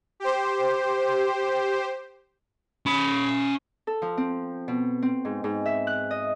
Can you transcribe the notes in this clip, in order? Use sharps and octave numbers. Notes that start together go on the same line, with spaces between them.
G4 C5
C#4 B5
A4
F3
C4
B2
C4
G#2
G#2
E5
F#6
D#5